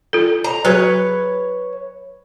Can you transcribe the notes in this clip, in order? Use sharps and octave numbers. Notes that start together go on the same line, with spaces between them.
F4 A4
A#5
F#3 F#4 G#4 B4 C#5